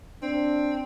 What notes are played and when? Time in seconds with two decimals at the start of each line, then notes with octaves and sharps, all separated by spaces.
0.22 C4 D4